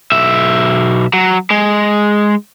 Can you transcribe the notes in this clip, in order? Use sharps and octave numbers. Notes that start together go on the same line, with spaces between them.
B1 E5
F#3
G#3